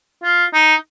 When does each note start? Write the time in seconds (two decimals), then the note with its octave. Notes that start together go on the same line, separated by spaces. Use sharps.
0.24 F4
0.53 D#4